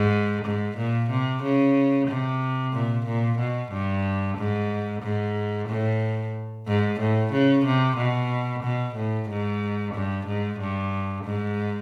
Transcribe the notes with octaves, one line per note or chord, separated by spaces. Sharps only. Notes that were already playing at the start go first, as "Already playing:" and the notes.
Already playing: G#2
G#2
A#2
C3
C#3
C3
A#2
A#2
B2
G2
G#2
G#2
A2
G#2
A2
C#3
C3
B2
B2
A2
G#2
G2
G#2
G2
G#2